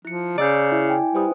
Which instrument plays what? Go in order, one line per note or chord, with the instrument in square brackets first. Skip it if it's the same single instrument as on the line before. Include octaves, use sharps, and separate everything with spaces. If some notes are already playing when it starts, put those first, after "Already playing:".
[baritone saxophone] F3 [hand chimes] E4 C#7
[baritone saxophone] C#3 [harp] D5 [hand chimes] A#5 E6 G6
[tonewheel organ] E4
[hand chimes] G5 G#5
[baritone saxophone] G3 [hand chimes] B4 C5 D#6